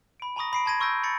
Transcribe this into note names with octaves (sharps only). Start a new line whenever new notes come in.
B5 D7
G#5 A#5 B5 C#6 D#6 A#6
B5 C7 D7
A5 C6 G#6 A#6 D#7
C6 C#6 E6 G6 A#6 D7
B5 G#6 A6 C#7